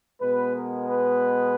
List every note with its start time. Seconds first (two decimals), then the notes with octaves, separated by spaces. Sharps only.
0.20 B2 G#3 B3 B4
0.55 A#4
0.90 B4